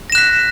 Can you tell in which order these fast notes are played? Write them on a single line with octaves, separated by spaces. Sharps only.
A#6 E7 F#6 B6